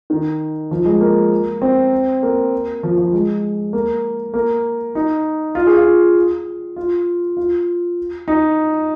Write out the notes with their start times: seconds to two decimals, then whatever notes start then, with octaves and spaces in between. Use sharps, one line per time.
0.10 D#3
0.71 F3
0.85 G#3
1.01 A#3
1.62 C4
2.23 A#3
2.83 F3
2.98 F3
3.13 G#3
3.73 A#3
4.34 A#3
4.95 D#4
5.55 F4
5.67 G#4
5.77 F4
6.76 F4
7.37 F4
8.28 D#4